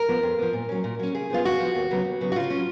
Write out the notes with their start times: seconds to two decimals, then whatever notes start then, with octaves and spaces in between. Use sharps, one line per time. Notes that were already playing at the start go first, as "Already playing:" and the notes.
Already playing: A#4
0.08 F3 B3
0.23 F2
0.39 F3 B3
0.53 A#2
0.69 F#3 C#4
0.84 A#2
0.99 F#3 C#4
1.15 C#3 G#4
1.30 F3 B3 F4
1.45 C#3 F#4
1.60 F3 B3
1.75 D#2
1.91 C#3 F#3 B3
2.05 D#2
2.21 C#3 F#3 B3
2.32 F#4
2.36 C#3 F4
2.50 C#4
2.55 F#3